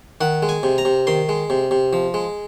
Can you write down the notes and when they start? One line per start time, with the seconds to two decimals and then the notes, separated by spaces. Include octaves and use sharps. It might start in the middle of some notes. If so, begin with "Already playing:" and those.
0.21 D#3 F#5
0.42 G#3
0.49 G#5
0.63 C3
0.78 A#5
0.85 C3
1.07 D#3 C6
1.29 G#3
1.50 C3
1.71 C3
1.93 F3
2.14 G#3